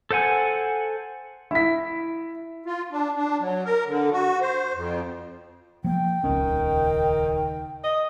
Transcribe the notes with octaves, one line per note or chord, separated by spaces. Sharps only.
A4 C5 F#5 G#5
E4 B6
F4
D4
D4
F#3
A#4
D3
F#4
C5
F2
F3 A#3 G5
D#1 C#2 D#3 C#4
D#5